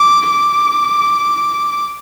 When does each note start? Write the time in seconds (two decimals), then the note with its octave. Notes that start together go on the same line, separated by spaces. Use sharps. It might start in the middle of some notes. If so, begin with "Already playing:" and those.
Already playing: D6
0.30 D6